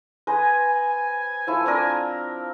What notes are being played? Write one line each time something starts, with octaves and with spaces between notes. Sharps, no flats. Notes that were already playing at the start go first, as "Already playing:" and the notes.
B4 C5 D#5 G#5
F3 A3 E4
C4 D4 A#4